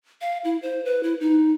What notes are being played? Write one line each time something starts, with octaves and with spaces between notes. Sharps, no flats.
F5
E4
C5
B4
E4
D#4